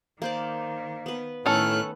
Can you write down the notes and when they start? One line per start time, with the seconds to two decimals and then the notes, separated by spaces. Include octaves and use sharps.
0.22 D#3 A#3 C5 D5
1.06 B3 B4
1.46 A2 D#3 A3 C#4 A4 F6 F#6